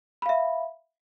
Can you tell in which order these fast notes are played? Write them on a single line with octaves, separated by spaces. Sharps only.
B5 F5 E5